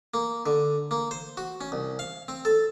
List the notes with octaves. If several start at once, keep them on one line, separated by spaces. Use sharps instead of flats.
A#3
D3
A#3
C5
F#4
C#4
C2
F5
C4
A4